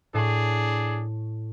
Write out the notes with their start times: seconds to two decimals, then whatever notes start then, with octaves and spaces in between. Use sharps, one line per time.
0.14 A2 D4 G#4 A5 C#6